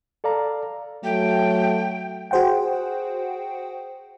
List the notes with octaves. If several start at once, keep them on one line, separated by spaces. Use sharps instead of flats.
A4 D5 F5 A#5
F#3 A3 G5
F#4 G#4 C5 F#5 G5